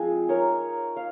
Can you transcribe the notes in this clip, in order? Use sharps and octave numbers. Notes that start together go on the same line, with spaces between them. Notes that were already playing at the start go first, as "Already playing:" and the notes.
Already playing: F3 G#3 C4 G#4
D#4 A#4 C#5
F5